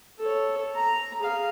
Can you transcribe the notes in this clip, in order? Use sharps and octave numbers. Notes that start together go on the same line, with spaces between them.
A4 C#5
A#5
G#4 F5